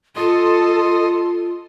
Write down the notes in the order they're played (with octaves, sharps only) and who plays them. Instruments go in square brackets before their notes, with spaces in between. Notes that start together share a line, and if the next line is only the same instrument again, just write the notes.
[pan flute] F4 [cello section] A4 [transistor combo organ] D#5 C6